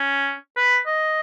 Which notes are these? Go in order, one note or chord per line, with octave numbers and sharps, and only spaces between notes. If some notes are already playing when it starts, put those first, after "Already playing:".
Already playing: C#4
B4
D#5